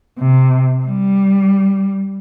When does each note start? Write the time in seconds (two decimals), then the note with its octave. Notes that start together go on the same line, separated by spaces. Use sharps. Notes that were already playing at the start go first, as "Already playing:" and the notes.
0.19 C3
0.85 G3